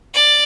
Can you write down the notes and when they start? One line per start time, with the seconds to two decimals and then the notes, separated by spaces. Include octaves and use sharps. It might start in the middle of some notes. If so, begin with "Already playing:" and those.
0.15 D5